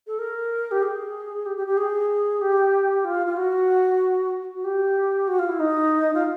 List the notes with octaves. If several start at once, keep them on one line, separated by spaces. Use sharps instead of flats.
A4
A#4
G4
G#4
G4
G4
G4
G#4
G4
F4
F4
F#4
F#4
G4
F#4
F4
E4
D#4
F4